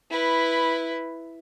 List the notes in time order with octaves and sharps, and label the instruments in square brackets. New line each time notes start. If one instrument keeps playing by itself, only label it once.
[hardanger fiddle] E4 B4